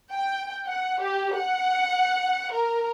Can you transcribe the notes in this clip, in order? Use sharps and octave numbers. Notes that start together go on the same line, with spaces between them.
G5
F#5
G4
F#5
A#4